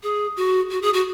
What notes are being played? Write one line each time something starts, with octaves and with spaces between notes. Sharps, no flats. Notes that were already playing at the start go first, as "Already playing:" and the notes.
G#4
F#4
F#4
G#4
F#4